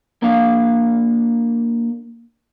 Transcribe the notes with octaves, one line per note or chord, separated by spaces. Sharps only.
A#3 D4 F5